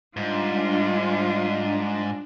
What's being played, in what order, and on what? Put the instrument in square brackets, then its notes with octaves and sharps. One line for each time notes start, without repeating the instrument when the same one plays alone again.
[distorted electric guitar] G#2 [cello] G3 F4 [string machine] D4